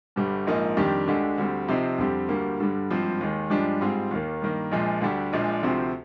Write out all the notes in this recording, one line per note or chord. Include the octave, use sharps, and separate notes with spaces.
G1 G2 D3 G3
A#1 G#2 F3 A#3 D#4
F2 D#3 G3 D4 G4
D2 D3 G#3 D4 G4
D2 D3 G3 C4
C3 F3 C4 D#4
F2 D3 G3 C4 G4
D2 D3 G3 A#3
G2 D3 G3
G#1 G2 F3 C4
D#2 D#3 G#3
G2 F3 G#3 D4 G4
G#2 G3 C4 F4 G#4
D#2 D#3 A#3
G2 D#3 A#3
A#1 A#2 F3 G#3
D2 D3 G3 D4 G4
A#1 A#2 F3 G#3 D4
D2 C3 F3 C4